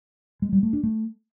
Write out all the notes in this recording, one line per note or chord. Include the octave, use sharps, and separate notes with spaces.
G#3
G3
A3
D4
A3